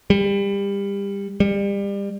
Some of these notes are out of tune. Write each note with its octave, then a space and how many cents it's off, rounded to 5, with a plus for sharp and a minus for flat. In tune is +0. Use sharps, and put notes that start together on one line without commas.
G3 +25
G3 +30